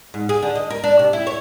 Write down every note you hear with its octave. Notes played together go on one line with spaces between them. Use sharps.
G#2
G#4
D3
D#5
A#4
D4
C3
E4
C#5